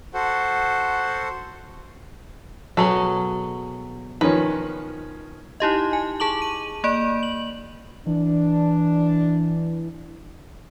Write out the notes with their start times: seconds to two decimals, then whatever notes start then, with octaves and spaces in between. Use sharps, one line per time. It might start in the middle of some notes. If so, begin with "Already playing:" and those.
0.14 F#4 A4 C5 F#5
2.77 B2 F#3 C#4 G#4 A4
4.21 D#3 F3 C#4 B4 D#5
5.60 D#4 E4 G4 D#5
5.93 G#5
6.20 G#4 A5 D6 F#7
6.42 D#7
6.84 A#3 D5 B5 D7
7.23 F#7
8.07 E3 D4